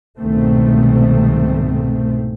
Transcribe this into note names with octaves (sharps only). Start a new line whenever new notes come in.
C2 G#2 B2 D#3 A3 C4